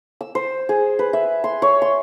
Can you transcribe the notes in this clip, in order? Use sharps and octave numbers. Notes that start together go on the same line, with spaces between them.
E6
C5
G#4
B4
E5
C6
C#5
C6